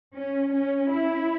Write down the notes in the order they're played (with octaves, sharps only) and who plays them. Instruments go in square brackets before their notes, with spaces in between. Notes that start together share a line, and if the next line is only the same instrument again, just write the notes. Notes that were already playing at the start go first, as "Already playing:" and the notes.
[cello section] C#4
C#4
E4